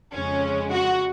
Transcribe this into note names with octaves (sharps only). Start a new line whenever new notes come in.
F2 C#3 G#3 C#4
F#4